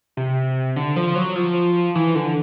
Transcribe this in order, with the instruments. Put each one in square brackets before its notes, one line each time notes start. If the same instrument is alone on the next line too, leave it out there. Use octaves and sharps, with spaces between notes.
[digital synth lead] C3
D3
F3
F#3
F3
E3
D3